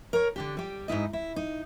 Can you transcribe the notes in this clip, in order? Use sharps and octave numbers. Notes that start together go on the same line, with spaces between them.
A#4 C#5
D3 D4 G4
G3 G4
G#2 D#4 E4 D#5
E4
D#4